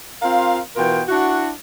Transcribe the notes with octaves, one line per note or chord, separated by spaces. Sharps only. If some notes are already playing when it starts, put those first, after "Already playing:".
C4 F4 A#4 F5
B2 E3 F4 A#4 G5
D4 E4 F#4